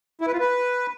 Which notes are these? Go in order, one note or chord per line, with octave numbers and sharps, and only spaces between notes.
E4
B4
F4
B4